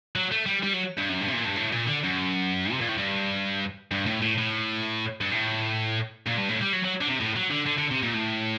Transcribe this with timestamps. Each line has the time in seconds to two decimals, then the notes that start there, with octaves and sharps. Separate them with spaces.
0.15 F#3
0.31 A3
0.46 G3
0.63 G3
0.74 F#3
0.97 G2
1.09 F#2
1.21 G2
1.28 C3
1.33 A#2
1.45 G2
1.56 A2
1.72 A#2
1.87 D3
2.03 F#2
2.72 C3
2.81 A#2
2.89 A2
2.98 G2
3.91 G2
4.06 A2
4.22 A2
4.38 A2
5.21 G2
5.32 A2
6.26 A#2
6.37 G2
6.49 A2
6.62 G3
6.73 F#3
6.84 F#3
7.01 D3
7.08 C3
7.20 A2
7.36 F#3
7.50 D3
7.66 D3
7.78 D3
7.91 C3
8.02 A#2
8.14 A2